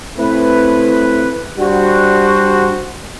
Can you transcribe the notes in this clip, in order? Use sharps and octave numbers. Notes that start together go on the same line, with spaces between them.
A3 C4 E4 B4
G3 D4 F#4 C5